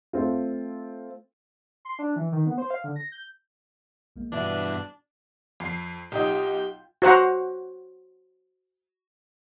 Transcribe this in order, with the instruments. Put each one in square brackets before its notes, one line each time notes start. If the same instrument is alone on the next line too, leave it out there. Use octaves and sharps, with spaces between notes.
[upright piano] A3 C4 F4
[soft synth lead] C6
D4
E3
D#3
B3
C5
F5
D3
A#6
G6
[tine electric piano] A#1 G#3 A#3
[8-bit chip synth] G2 B2 E3 [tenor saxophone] D4 [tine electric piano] B4 E5 B5
[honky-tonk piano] F2 C7
[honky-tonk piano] B1 D#4 D#5 [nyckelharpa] F4 G5 [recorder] G4
[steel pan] F#4 C5 F#5 A#5